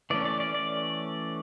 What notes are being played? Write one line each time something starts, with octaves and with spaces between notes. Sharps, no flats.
E3 A3 C#4 D5
D5
D5
D5